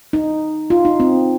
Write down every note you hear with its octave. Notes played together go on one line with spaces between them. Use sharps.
D#4
F4
D#4
C4